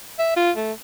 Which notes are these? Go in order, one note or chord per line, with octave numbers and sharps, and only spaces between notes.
E5
F4
A3